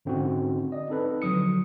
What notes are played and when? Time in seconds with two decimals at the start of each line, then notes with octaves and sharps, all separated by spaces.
0.05 G#2 D3 C4 C#4 D#4 F#4
0.72 D5 D#5
0.89 C4 D#4 A4 B4
1.22 D3 F3 F#3 D#6 C#7